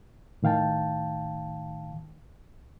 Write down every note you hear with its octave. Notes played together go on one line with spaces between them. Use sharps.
A2 D#3 F5 G5 A5